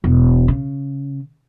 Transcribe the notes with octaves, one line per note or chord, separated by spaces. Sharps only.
E1
C#3